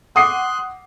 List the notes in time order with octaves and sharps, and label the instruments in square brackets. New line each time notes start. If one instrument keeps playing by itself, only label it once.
[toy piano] F#5 D6 [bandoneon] C6 F#6 [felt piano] D#6 C7